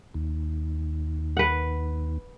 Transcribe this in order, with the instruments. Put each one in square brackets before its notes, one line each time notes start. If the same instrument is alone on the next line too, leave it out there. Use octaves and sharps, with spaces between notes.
[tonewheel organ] D#2
[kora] B4 F#5